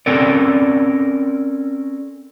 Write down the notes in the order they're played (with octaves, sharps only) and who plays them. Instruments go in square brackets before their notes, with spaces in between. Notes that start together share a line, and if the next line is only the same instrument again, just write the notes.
[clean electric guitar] C4 C#4 A4 A#4 D5